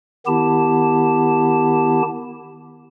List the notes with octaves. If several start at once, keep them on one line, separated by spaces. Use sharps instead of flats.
D#3 B3 E4 G4 A5